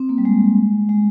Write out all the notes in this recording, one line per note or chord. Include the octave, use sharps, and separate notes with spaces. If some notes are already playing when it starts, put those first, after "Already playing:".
Already playing: C4
A#3
G3
G#3
G#3